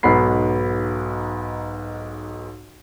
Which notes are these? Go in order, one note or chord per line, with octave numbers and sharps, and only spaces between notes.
B1 G#2 B3 B5 C7